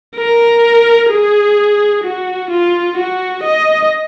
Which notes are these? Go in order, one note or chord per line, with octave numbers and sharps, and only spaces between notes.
A#4
G#4
F#4
F4
F#4
D#5